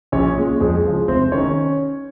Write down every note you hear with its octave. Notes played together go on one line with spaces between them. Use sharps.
A#1 C#4 C#5
A#2 G#3
F2 G#3 G#4
C#3 F3 G#3
F1 C4 C5
D#3 C#4 C#5